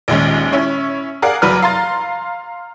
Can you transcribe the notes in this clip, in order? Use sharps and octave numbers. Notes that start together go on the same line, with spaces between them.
A#1 D#2 G#3 C#4
C#4 E4 C#5
G#4 A#4 D5 F5 F#5
F#1 F#3 B4 D5 A#5 F6
F5 A#5 C6 A6